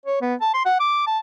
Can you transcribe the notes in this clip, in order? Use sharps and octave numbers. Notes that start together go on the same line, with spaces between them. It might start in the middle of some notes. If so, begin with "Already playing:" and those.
C#5
B3
A5
C6
F#5
D6
A5